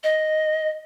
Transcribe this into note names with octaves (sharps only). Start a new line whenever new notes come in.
D#5